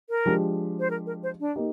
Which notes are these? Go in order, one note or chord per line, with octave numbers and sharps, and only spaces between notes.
A#4
F3 G#3 D4 G4
C5
A#4
A#4
C5
D4
A#3 D#4 G4